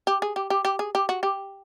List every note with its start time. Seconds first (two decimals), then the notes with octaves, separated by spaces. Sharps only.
0.07 G4
0.22 G#4
0.36 G4
0.50 G4
0.65 G4
0.79 G#4
0.95 G4
1.09 F#4
1.23 G4